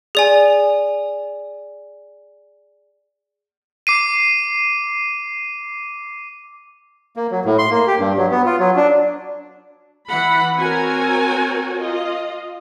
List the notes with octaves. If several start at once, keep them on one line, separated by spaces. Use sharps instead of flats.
G#4 D5 G#5
D6 C7 D#7
A#3
F#3
A2
C6
A#3
G4
G2
F#3
B3
F4
F#3
D4
E3 F#5 B5
C4 F#4 A#4 C#5 G#5
F4 D#5